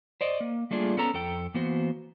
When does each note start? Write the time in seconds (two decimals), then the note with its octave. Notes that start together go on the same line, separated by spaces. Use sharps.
0.21 C5 D5 D#5
0.40 A#3
0.71 G3 A3 A#3 D4 F4 G#4
0.97 B3 C#4 A4 A#5
1.14 F2 A4 G5
1.54 E3 A#3 B3 F#4 C5